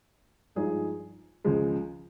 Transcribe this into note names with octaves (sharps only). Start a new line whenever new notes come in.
G2 F3 G#3 D#4 G#4
C#2 C#3 F3 G#3